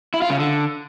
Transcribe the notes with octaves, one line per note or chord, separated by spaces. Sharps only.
E4
F4
C#3
D3